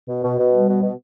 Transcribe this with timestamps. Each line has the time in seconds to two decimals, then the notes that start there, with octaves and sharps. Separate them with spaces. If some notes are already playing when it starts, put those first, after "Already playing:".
0.08 B2
0.23 B2
0.38 B2
0.53 G3
0.68 B2
0.82 B2